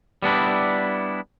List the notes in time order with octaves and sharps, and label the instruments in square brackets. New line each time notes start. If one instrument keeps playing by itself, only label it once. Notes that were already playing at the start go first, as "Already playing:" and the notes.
[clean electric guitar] G3 B3 D4 E4